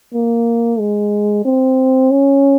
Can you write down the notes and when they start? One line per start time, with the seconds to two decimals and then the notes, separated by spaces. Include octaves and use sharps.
0.14 A#3
0.79 G#3
1.45 C4
2.11 C#4